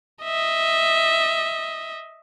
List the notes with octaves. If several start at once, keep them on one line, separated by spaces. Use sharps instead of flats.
D#5 E5